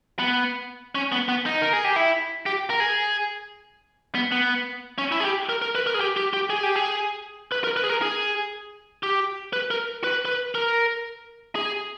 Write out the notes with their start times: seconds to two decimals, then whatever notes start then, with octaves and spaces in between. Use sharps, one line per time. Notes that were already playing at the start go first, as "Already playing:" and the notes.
0.19 B3
0.95 C#4
1.12 B3
1.29 B3
1.46 D#4
1.62 A#4
1.73 G#4
1.84 G4
1.96 E4
2.46 G4
2.70 A#4
2.80 G#4
4.15 B3
4.32 B3
4.98 C#4
5.12 E4
5.20 G#4
5.24 G4
5.49 A#4
5.62 A#4
5.75 B4
5.87 A#4
5.94 G#4
6.01 G4
6.17 G4
6.33 G4
6.50 G#4
6.63 G4
6.76 G#4
7.52 B4
7.64 A#4
7.77 B4
7.84 G#4
7.90 A#4
8.02 G#4
9.03 G4
9.53 B4
9.71 A#4
10.04 B4
10.25 B4
10.55 A#4
11.55 G#4